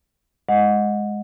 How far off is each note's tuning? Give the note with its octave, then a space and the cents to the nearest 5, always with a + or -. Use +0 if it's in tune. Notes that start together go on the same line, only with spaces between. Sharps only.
G#3 +0 D#5 +0 F#5 -25